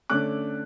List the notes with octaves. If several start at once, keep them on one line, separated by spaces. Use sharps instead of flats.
D3 A3 C#4 D6 F#6